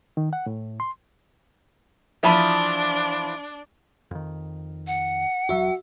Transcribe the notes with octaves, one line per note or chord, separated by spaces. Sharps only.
D#3
F#5
A2
C6
E3 F3 D4 E5 A5 B5
F2 D#3
F#5
E1 F#3 F#4 E5